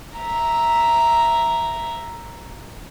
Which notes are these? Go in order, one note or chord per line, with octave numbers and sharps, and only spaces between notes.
E5 A#5